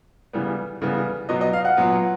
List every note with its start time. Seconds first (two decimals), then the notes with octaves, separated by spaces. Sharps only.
0.33 C#3 E3 G3 B3
0.82 C#3 E3 G3 B3
1.29 B2 F#3 B3 D#5
1.41 D#5
1.53 F5
1.65 F#5
1.77 A#2 F#3 B3